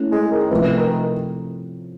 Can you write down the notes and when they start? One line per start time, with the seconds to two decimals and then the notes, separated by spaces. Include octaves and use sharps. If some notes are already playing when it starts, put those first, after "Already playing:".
Already playing: A3 C#4 E4
0.12 G#3
0.31 D#3
0.51 C3 E3 F3 A3
0.77 D#3